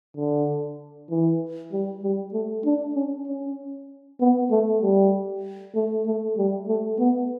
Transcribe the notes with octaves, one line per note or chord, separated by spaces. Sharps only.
D3
E3
G3
G3
A3
D4
C#4
C#4
B3
A3
G3
A3
A3
G3
A3
B3